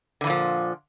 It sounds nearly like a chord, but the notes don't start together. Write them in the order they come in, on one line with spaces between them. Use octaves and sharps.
D3 E3 A#2 F3